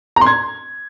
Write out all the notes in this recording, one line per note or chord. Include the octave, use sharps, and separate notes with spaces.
A#5
C6
G#6